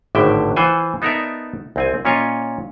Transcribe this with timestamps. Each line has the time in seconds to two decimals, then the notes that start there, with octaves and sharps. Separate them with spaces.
0.15 G#1 A2 D3 E5 G5
0.56 E3 F4 C5 F#5 G#5
1.02 B3 D#4 A4 A#4 D5 E5
1.76 C2 C4 G#5
2.05 A#2 C#4 F4 C#5 D#5